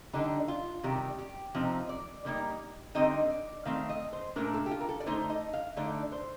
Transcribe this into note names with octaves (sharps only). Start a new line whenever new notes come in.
D3 G3 D4 D#4
F4
C3 D#3 G3 G4
G4
C3 F3 C4 D#4
D5
D3 G3 A#3 D#4
D3 G3 C4 D#4 D#5
D5
D#3 A3 C4 F5
D#5
C5
A#2 A3 D4 A#4
A4
G4
F4
A#4
A4
D5
D3 A3 D#4 C5
D#5
F5
D3 A3 D#4 D5
C5